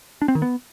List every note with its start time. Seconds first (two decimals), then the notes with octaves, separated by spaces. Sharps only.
0.22 D4
0.28 C4
0.35 D#3
0.42 B3